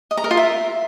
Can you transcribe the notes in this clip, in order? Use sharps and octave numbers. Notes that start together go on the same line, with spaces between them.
D#5
A#5
A#4
F4
E5